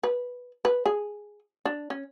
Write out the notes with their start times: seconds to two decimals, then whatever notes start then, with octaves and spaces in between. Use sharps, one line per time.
0.03 B4
0.65 B4
0.86 G#4
1.65 D4
1.90 C#4